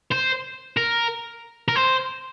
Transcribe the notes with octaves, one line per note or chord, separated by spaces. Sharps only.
C5
A#4
A#4
C5